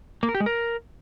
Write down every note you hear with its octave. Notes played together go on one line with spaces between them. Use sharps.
A#3
A#4
G4
G#3
A#4